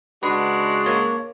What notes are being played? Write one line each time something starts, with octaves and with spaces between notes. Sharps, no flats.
C#3 G#3 D4 F#4 B4
A#3 C#5